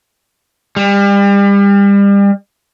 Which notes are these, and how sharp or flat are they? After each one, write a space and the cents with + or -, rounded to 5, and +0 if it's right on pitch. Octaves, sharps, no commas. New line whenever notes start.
G3 +35